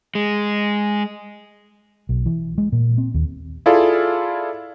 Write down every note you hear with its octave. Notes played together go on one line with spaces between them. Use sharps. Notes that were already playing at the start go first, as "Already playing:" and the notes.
G#3
B1
E3
G#3
A#2
C4
D#2
E4 F4 G#4 A4 D5 F5